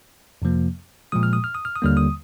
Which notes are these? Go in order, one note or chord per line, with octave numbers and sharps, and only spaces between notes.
F2 C3 F3 A#3
A#2 F3 G#3 D#6
F6
D#6
F6
D#6
F6
D#6
D#2 D3 G3 A#3 F6
D#6